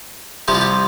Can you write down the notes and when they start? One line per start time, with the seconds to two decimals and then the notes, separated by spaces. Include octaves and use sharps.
0.48 C2 C3 F3 G4
0.55 F4
0.61 G4